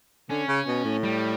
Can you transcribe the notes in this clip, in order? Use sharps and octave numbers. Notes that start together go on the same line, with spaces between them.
D3 C#4
C#3
B2
A2
G3